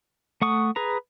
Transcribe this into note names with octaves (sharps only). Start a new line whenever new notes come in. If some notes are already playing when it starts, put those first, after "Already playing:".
A3 F#5 C#6 D#6
G#4 B4 A#5